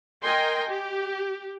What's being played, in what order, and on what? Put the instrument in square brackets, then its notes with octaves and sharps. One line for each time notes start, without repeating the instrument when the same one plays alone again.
[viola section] A#4 D#5 G5 G#5 C6
G4